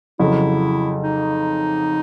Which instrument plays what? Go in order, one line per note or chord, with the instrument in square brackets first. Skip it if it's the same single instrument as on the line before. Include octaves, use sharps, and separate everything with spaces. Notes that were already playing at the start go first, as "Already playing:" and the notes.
[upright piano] F2 C#3 F#3 [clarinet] E4
[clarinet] D#4